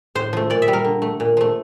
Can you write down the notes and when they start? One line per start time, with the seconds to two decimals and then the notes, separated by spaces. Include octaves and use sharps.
0.15 A2 C5
0.33 F3 A3
0.50 A#2 D5
0.62 E5
0.68 G3
0.73 A#4
0.85 D3
1.02 A3
1.20 A#2
1.37 F3 A3